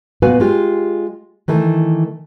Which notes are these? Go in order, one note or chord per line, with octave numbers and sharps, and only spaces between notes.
A#2 B3 F#4 B4 F5 G#5
G#3 F4 G4
D#3 E3 A3